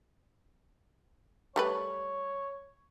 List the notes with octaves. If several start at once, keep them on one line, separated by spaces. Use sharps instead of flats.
G3 A3 B4 C#5